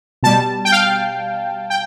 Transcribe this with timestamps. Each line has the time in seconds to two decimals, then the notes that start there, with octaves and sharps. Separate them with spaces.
0.23 B2 G3 A5
0.65 G5
0.72 F5
1.70 G5